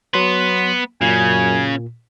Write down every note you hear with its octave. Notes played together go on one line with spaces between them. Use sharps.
F#3 B3 B4 C6
F#2 A#2 C#3 G#5